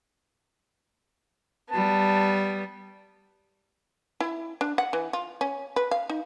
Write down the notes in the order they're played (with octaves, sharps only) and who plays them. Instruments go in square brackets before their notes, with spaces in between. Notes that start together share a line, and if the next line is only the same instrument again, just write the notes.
[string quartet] G3 B3 [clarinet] A5
[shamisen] E4
D4
F#5
E3
F4
C#4
B4
F5
D#4